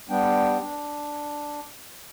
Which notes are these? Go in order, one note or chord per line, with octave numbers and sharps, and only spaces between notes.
G3 B3 D4 G5
D4